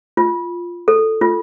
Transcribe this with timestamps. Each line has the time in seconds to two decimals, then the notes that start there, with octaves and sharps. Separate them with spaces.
0.17 F4
0.88 A4
1.21 F4